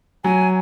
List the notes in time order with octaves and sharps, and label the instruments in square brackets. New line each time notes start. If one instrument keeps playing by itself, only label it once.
[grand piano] F#3 [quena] G#5